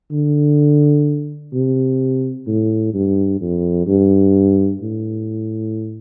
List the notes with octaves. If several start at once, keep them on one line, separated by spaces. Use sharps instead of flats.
D3
C3
A2
G2
F2
G2
A2